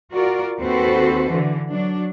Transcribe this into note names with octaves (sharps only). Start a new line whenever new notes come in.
F4 F#4 A#4 D5
D#2 C4 F#4 A4 B4 C5
D3 E3
F#3 D4